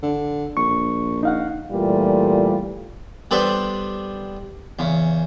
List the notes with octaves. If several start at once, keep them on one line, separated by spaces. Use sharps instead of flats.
D3
A#1 C#6
D#4 F5 F#5
A#2 E3 G3 A3 F4
G3 B3 D4 A4 B4 C5
E2 C#3